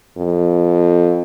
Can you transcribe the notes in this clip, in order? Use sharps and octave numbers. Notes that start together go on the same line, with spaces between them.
F2